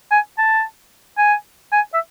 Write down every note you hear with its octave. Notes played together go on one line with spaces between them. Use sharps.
G#5
A5
G#5
G#5
E5